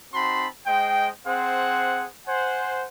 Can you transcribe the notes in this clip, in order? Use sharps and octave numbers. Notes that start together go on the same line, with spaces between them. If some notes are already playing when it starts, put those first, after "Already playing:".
C4 D#4 F#4 A5 B5 C6
G#3 C5 D#5 G5
C4 G#4 C5 F#5
C5 F#5 G#5